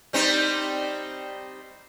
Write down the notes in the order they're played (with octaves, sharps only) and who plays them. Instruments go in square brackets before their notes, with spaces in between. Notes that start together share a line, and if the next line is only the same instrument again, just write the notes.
[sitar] G3 C4 D#4